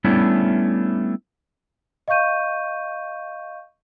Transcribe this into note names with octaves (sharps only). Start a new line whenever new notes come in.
G3 A3 B3 C#4 D4 E4
D#5 F5 C#6 G6 D#7